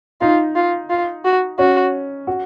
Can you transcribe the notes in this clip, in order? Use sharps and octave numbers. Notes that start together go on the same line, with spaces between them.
D#4 F4
F4
F4
F#4
C#4 F#4
F#4